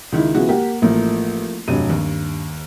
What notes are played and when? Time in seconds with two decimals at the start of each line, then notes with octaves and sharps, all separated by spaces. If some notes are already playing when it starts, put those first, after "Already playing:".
0.12 C#2 D#3 E4
0.35 C#3 F3 G#3 B3 E4 F#4
0.49 A#3 G4 F#5
0.82 A1 F3 A3 A#3
1.68 F1 G2 F#3 D#7
1.89 D#2